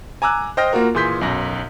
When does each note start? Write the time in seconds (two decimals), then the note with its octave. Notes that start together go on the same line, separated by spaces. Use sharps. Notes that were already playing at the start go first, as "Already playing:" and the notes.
0.22 G#5 A#5 D6 E6 F#6
0.57 C5 D#5 G5 F6 A#6
0.73 A#3 F4 F#4 A#4
0.95 A#2 E3 G#4 C6 G6 B6
1.21 B1 F#2 A#6